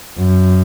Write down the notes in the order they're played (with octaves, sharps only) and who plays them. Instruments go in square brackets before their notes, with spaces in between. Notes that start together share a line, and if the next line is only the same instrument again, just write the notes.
[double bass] F#2